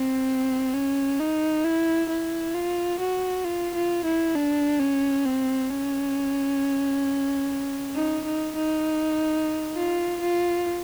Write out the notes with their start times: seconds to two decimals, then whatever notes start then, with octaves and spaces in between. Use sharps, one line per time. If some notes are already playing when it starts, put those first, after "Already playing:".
Already playing: C4
0.74 C#4
1.20 D#4
1.64 E4
2.09 E4
2.54 F4
3.00 F#4
3.44 F4
3.75 F4
4.05 E4
4.35 D4
4.80 C#4
5.25 C4
5.70 C#4
7.96 D#4
8.26 D#4
8.56 D#4
9.76 F4
10.22 F4